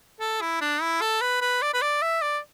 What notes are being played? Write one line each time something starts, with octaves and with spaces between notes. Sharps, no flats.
A4
E4
D4
E4
A4
B4
B4
D5
B4
D5
E5
D5